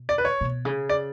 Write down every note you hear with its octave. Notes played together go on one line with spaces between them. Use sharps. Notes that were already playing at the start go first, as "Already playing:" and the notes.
Already playing: B2
D5
B4
C#5
B2
C#3
D5